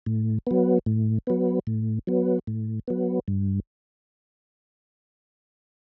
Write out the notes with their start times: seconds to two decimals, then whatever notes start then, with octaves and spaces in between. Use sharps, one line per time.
0.06 A2
0.47 F#3 B3
0.86 A2
1.27 F#3 B3
1.67 A2
2.07 F#3 B3
2.47 A2
2.88 F#3 B3
3.28 G2